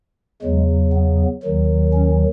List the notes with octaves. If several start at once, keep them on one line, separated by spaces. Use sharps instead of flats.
E2 C#3 F#3 G#3
B3
D#2 D#3 F#3
C#4